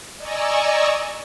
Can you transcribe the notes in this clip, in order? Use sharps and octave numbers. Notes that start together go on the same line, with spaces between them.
D5 D#5 G#5 A#5 C#6 E6